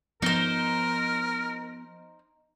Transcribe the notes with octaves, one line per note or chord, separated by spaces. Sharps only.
F3 B3 D#4 A#4 C5